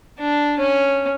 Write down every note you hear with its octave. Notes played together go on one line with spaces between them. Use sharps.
D4
C#4